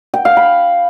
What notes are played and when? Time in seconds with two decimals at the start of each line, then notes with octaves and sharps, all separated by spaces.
0.14 G5
0.25 F5
0.37 B5